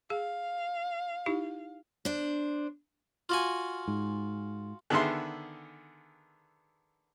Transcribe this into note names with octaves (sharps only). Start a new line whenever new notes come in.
G#4 F5
D#4 E4 G4
D4 C5
F4 F#4 G#5
G#2
D3 D#3 B3 G#4 E5 C6